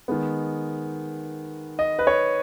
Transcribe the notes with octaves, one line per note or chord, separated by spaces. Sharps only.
D#3 G#3 B3
D#5
B4
C#5